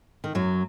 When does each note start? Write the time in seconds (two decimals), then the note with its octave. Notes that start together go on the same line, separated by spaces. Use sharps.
0.24 D#3
0.35 F#2 F#3